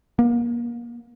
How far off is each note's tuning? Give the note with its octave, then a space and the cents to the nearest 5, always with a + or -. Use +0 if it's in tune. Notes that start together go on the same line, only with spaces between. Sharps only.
A#3 +30